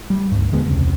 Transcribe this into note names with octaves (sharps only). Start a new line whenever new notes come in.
G3
C#2 G2
D#1 D3 G#3 B3
E1 C#2 C3